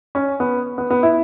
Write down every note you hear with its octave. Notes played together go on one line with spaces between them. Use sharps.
C#4
B3
B3
B3
E4